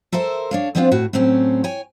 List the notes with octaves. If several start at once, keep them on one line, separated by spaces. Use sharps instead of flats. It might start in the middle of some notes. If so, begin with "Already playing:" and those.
A4 A#4 C5 E5
D4 C#5 F5
F3 G3 B3 C4 D4 F4
A2 F#4
A2 F#3 C4 C#4
C#5 G5 G#5